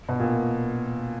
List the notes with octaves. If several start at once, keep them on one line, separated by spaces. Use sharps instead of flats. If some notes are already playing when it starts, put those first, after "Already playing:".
B2
A#2